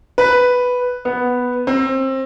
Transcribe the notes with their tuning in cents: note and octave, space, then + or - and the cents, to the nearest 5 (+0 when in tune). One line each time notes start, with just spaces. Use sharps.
B4 +0
B3 +0
C4 +25